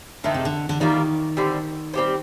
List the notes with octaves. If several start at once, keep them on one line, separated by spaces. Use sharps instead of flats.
D3 D#3 A3 C4 D#4
C3
D3
D3
D#3 G3 A#3 F4
D3 G3 C4
G3 C4 G4 C5